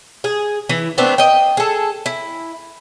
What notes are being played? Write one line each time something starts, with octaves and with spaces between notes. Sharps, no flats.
G#4
E3 E4
A3 B3 C4 D4
D#5 G5
G#4 A4
E4